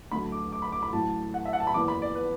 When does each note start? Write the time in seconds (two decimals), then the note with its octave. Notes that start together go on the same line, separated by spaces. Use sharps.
0.11 D2 D3 F#3 A3 B5
0.32 D6
0.52 D6
0.62 B5
0.72 D6
0.83 B5
0.93 A1 A2 F#3 A5
1.34 F#5
1.45 E5
1.53 F#5
1.60 A5
1.67 B5
1.74 F#1 E2 E3 B3 D6
1.88 B5
2.02 D5
2.15 B4